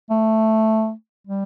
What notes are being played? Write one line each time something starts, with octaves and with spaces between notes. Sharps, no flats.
A3
G3